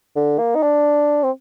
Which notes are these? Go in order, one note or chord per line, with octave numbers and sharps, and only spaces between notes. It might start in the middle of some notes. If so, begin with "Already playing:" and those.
D3
A#3
D#4
D4
C4